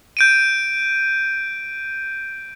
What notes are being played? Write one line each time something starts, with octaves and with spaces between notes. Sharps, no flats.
G6 D7 D#7